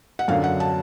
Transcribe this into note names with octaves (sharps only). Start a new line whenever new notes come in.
F#5
F#2 D3 F#3 F5
F#5
A5